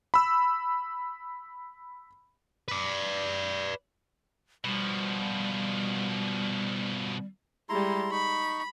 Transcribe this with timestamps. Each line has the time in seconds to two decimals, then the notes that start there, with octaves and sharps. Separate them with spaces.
0.14 B5 E6
2.68 B4 D5
4.64 B2 F3 G3
7.69 G3 G#3 E4 A#5 C6
8.12 D#4 B5 C#6